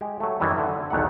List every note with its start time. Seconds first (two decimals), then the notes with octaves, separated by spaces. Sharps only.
0.01 G#3 G4
0.20 F#3 A3
0.40 F#2 D#3 E3 G3
0.58 D3
0.90 B1 E2 D#3 A3 F#5